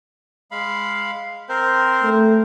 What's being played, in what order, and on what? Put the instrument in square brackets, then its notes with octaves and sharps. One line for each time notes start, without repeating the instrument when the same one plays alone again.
[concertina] G#3 F5 B5
C4 A#4 C5
[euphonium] A3